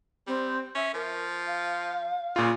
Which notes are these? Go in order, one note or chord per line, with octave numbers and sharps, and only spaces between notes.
G3 C4
C#4 E5
F3 A#4
F5
A#2 C#3 F4